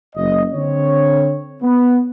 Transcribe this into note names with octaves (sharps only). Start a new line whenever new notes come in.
F#1 D#5
D3 C4 C#5
B3